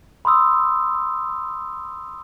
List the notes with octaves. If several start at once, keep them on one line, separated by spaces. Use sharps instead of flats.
B5 C6 D#6 E6